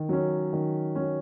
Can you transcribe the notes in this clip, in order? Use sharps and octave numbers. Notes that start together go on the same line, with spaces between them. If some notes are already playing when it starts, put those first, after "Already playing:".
Already playing: D#3
F#3 C#4
D#3
F#3 C#4